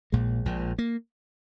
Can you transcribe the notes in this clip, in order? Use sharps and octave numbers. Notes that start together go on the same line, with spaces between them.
A#1 A#2 G#3
A#1 A#2
A#3